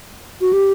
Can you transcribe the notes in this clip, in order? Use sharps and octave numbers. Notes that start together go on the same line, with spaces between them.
F#4
G4